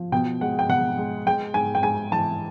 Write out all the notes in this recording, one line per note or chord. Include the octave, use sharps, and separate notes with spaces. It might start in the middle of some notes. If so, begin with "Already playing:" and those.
Already playing: F3
B2 G5
G#3 F#5
G5
B2 F#5
G#3
G#3 G5
G#2 G#5
G5
G#2 G#5
E3 A5